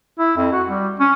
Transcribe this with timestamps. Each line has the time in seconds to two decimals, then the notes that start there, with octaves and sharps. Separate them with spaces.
0.19 E4
0.37 F2
0.53 F#4
0.69 G3
1.00 C#4